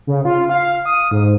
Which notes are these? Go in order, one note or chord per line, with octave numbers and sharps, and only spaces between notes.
C#3
F4
F5
D#6
G#2